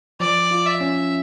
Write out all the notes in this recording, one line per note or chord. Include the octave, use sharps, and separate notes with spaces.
F3 D5
F4
E5
C#4